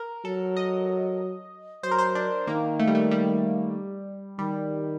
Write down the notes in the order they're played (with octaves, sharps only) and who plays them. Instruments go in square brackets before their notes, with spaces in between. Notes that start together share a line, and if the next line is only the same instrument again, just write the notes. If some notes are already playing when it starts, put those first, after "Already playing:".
Already playing: [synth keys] A#4
[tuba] F#3 [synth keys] A4
[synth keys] D#5
[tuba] F#3 [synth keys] C5
[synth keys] A#4
C5
D4
[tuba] D#3 [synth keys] A#3
[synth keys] A3
G3
A3
G3
[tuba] D#3 [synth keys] G3